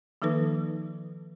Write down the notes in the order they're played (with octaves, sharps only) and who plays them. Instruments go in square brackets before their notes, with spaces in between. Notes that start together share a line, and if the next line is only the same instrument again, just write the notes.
[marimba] D#3 F3 A#3 D#4 A4 B4